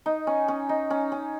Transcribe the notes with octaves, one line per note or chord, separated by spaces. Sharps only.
D#4
C#4
C#4
D#4
C#4
C#4